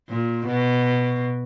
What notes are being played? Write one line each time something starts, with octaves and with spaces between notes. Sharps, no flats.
A#2
B2